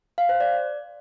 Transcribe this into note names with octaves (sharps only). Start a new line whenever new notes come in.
F5
C5
D5